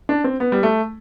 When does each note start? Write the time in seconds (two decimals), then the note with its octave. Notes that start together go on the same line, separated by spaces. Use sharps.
0.09 D4
0.24 C4
0.40 B3
0.52 G3
0.63 A3